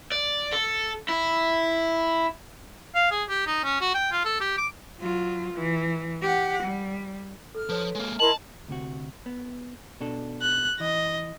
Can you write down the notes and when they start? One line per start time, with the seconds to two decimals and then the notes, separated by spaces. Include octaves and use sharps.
0.12 D5
0.52 A4
1.08 E4
2.95 F5
3.11 G#4
3.29 G4
3.47 D#4
3.64 C#4
3.81 F#4
3.94 G5
4.12 F4
4.25 A4
4.41 G4
4.58 D6
5.00 F#3 F4
5.54 E3
6.22 G4 F#5
6.64 G3
7.55 A4 F6
7.69 F3 A4 B4 C#5
7.95 G#3 A#3 F6
8.20 E4 A#4 D#5 A5 C6 F#7
8.68 D2 C3 F#4
9.26 B3
10.00 B2 D4 A4
10.42 F#6
10.80 E3 D#5